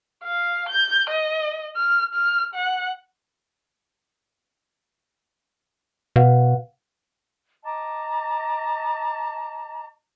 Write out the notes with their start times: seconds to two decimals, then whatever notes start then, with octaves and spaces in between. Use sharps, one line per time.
0.24 F5
0.69 G6
1.10 D#5
1.76 F6
2.14 F6
2.55 F#5
6.16 B2 B4 F5 F#5
7.64 D#5 A5 A#5 D6